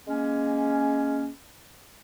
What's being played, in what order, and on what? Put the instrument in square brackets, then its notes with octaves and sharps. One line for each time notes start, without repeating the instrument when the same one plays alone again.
[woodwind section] G#3 A#3 C#4